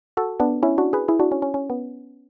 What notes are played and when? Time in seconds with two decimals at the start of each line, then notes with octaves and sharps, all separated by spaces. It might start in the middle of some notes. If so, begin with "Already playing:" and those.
0.17 F#4 A4
0.40 B3 D4
0.63 C#4 E4
0.78 D4 F#4
0.93 G#4 B4
1.08 E4 G#4
1.20 D4 F#4
1.32 C#4
1.42 C#4
1.54 C#4
1.70 B3